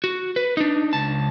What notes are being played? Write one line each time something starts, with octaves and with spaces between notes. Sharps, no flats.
F#4
B4
D4 D#4
C#2 A5